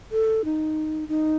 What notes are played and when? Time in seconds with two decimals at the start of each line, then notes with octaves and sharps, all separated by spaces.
0.12 A4
0.45 D#4
1.08 D#4